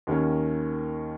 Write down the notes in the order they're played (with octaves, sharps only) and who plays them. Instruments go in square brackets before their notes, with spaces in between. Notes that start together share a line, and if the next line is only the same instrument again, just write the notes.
[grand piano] D#2 D#3 A#3 C#4